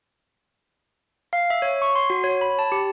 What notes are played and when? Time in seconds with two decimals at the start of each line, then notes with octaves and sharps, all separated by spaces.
1.33 F5
1.50 E5
1.62 C#5
1.82 C#6
1.96 C6
2.10 F#4
2.24 C#5
2.41 B5
2.59 A5
2.72 G4